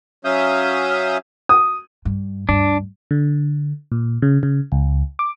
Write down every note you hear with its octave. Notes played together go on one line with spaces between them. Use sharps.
F#3 C#4 E5 F5 D#6 G6
D#6
G2
D2 G2 D4
D3
A#2
C#3
C#3
C#2
D6